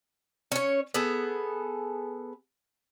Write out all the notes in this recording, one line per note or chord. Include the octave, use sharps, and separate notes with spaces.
C#4 C#5
B3 G#4 A4